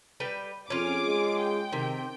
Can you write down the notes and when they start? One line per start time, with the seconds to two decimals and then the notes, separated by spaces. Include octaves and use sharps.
0.20 G3 B4 G5
0.70 F2 C#4 F4 G#4 D6
1.06 G#3
1.38 G5
1.73 C3 D#3